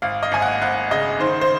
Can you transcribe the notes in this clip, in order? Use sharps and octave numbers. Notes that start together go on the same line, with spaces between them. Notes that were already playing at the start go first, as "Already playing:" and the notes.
G#1 F5
D#5
G#1 G#5
F#5
G#1 F#5
C#3 D#5
D#3 C5
C5